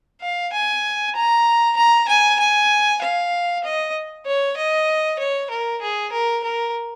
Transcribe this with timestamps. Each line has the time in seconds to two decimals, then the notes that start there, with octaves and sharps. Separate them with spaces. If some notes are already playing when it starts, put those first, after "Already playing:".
0.21 F5
0.53 G#5
1.15 A#5
1.77 A#5
2.08 G#5
2.39 G#5
3.01 F5
3.64 D#5
4.26 C#5
4.57 D#5
5.19 C#5
5.50 A#4
5.81 G#4
6.12 A#4
6.44 A#4